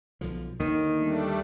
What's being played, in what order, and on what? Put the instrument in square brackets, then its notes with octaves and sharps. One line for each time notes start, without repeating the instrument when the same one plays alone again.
[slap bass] B1 D3 F3
[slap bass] D#2 D3 A#3 [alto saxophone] D#3
[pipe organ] G3 A3 D4